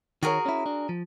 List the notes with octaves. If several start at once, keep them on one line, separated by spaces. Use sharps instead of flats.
D#3 F#4 G#4 A#4 C#5
C#4 E4
D4
F3